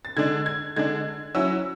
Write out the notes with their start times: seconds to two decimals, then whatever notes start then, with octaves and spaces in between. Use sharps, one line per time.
0.05 A6
0.17 D3 G#3 D4 G#6
0.46 G#6
0.76 D3 G#3 D4 G#6
1.35 F#3 C#4 E4 E6